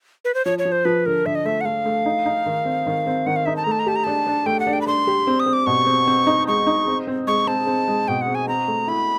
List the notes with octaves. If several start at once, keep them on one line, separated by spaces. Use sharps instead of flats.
B4
C5
F3 C#5
C#5
F3
C5
F3 B4
D3 A#4
D3 E5
D#5
A3 E5
F#5
A3 F5
A3
D#4
D#4
D#3
C4
D#3
C4
D#3 F#5
F5
D#4 E5
A5
A3 A#5
A5
A#5
G4 A5
A#5
D4 A5
D4
A3 G5
F#5
D4
G5
B5
D4 C6
G4
C4
D#6
C4
D6
B2 C#6
C4
C4
D#4
G#3 C#6
D#4
C4
C4
G#3 C#6
C4 A5
C4
G#3
B2 G5
F#5
C4
G#5
C4 A#5
A3
E4 B5